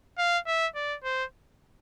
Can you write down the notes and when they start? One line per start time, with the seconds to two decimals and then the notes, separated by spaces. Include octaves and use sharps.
0.18 F5
0.47 E5
0.75 D5
1.04 C5